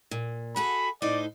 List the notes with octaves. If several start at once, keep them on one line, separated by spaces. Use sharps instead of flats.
A#2
F#4 G#4 A4 B5
A2 D#4 C5 D5